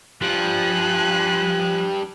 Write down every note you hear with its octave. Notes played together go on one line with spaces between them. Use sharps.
F3 G3 D4 G#5 F#6